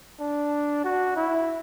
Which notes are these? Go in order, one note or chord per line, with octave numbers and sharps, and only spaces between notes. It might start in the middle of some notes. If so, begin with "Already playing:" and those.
D4
F#4
E4